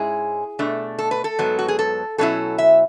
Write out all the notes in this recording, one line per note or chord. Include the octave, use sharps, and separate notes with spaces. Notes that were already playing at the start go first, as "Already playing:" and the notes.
Already playing: G#2 G#3 C#4 E4 G#4
B2 A3 D4
A4
B4
A4
G#2 F#3 B3
F#4
G#4
A4
B2 F#3 C#4 E4 A4
E5